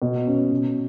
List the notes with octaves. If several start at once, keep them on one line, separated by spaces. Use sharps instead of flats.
B2
C#4
B2